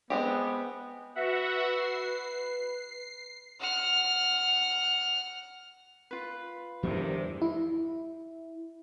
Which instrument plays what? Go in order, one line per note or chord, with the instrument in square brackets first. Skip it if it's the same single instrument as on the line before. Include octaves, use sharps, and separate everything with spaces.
[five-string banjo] G#3 C4 G4 [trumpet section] B3
[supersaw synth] F#4 E5 F#5 [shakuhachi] B4
[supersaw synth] C7
[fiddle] F#5 F6
[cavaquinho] F4 B4
[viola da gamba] E2 G2 D#3 [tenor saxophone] C3 [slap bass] F3 A3 C4
[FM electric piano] E4